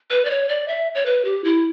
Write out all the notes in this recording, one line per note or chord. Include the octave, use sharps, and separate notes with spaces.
B4
D5
C#5
D5
E5
C#5
B4
G4
E4